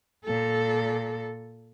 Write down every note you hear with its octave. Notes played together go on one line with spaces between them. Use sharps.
A#2 A4